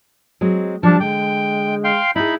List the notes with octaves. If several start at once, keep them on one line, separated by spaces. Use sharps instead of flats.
F#3 G#3 C4
F3 G3 D4 A5
D3 G#3 G5
F5 G5 C6
D#4 E4 G#4 B5